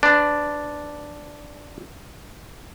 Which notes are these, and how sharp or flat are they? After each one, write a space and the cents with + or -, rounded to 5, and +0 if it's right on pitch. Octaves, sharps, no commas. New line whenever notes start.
D4 +0 B4 +30